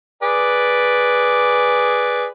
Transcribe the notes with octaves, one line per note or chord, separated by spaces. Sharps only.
G#4 B4 D5